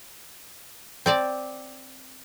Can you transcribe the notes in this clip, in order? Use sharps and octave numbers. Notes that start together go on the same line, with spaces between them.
C4 D5 A5